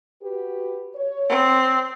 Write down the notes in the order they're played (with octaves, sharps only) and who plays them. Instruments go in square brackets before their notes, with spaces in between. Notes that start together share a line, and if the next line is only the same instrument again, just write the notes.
[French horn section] F#4 G4 B4
C#5
[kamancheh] C4